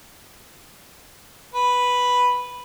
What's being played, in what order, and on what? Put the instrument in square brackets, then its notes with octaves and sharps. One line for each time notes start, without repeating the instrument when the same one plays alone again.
[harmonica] B4